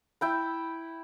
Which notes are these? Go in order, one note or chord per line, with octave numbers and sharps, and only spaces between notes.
E4 G5 B5